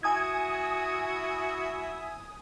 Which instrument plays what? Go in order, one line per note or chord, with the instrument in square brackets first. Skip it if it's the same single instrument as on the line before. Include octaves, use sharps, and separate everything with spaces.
[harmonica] E4 F#4 [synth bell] G#5 D#6 G#6